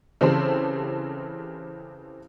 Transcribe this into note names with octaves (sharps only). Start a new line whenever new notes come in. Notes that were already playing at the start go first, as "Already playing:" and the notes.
C#3 E3 C4 G4 A4 C5